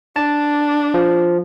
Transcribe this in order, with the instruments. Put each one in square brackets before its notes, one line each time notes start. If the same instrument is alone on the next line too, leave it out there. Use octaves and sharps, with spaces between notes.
[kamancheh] D4 [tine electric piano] A5
[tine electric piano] F3